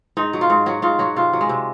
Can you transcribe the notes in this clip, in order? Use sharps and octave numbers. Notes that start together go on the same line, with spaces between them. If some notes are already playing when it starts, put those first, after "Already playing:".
G#2 D#4
F#3
F4
G#2
F#3 F#4
G#2 F4
F#3 F#4
C3 F4
F#3
G#3
C3